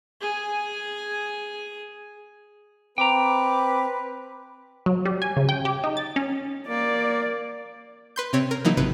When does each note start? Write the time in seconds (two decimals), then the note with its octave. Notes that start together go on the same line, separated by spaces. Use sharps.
0.21 G#4 G#5
2.98 C4 B4 G5 A#5 D6
4.86 F#3
5.05 G3
5.22 G#5
5.37 C#3
5.49 G5
5.65 G4
5.84 D#4
5.97 A6
6.16 C#4
6.68 A#3 D5
8.16 B4 C6 G6
8.33 C3 C4 C#5
8.51 A#4
8.65 E3 F#3 A#3 D#4
8.77 G#1 C3 B4